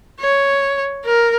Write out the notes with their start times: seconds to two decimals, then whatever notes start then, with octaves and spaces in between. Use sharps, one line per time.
0.20 C#5
1.06 A#4